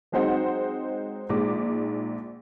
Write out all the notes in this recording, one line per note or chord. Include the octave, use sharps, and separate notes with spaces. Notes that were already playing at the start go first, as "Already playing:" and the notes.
F#3 G#3 C4 D#4 C5 F#5
A#1 G#2 G#3 D6